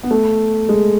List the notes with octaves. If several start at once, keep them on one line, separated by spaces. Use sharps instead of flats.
B3
A3
G#3